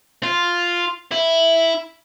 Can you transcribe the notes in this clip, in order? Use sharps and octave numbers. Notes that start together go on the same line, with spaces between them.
F4
E4